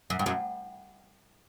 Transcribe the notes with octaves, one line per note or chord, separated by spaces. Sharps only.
F#2
G2
F#2